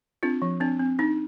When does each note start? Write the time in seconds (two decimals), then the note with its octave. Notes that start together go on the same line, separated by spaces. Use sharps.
0.23 C4 D4 F4
0.42 F3
0.60 C4 D4
0.79 C4
0.99 D4 D#4